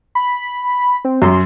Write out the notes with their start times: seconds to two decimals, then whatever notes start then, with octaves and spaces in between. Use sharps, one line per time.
0.15 B5
1.05 C4
1.22 F#2 C6